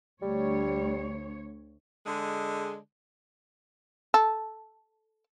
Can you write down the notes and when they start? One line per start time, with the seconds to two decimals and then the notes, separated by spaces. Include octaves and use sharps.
0.22 D2 G3 C#5
2.06 D3 G#3
4.14 A4